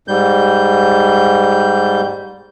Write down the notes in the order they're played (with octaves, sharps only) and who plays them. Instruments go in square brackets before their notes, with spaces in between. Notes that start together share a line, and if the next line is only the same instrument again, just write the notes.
[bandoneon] G#2 G3 G6